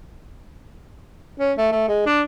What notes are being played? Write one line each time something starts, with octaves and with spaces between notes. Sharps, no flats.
C#4
A3
A3
G#3
D4